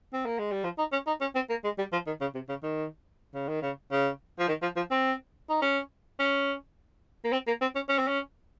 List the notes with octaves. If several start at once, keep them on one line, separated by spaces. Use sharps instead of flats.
C4
A#3
G#3
G3
F3
D#4
C#4
D#4
C#4
C4
A#3
G#3
G3
F3
D#3
C#3
C3
C#3
D#3
C#3
D#3
C#3
C#3
F3
D#3
F3
F3
C4
D#4
C#4
C#4
A#3
C4
A#3
C4
C#4
C#4
C4
C#4